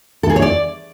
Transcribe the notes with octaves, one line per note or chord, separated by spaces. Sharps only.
A4
G#4
C#5
D5